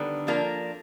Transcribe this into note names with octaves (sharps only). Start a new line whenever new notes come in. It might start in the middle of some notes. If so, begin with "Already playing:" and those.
Already playing: D3 D#3 G3 B3
F3 A#3 D4 F4 A#4